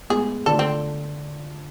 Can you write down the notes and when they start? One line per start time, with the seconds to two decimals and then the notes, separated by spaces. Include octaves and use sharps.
0.10 A2 G#3 B3 G#4
0.46 D3 A3 D4 F4 A4
0.59 C4